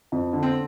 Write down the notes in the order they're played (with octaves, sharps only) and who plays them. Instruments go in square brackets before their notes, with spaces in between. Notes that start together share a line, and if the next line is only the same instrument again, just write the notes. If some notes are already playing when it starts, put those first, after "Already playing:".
[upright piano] F2
D3
[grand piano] C4